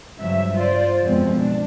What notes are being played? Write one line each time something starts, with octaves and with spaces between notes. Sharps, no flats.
G2 C#3 F3 F#3 E5
F4 C5 D5
F2 B2 F3 G#3 C4
D4